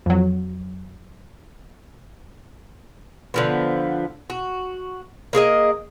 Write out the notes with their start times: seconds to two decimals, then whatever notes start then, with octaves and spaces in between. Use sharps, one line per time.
0.06 F2 F#3
3.34 D3 F3 B3
4.30 F#4
5.33 A#3 G#4 A#4 D#5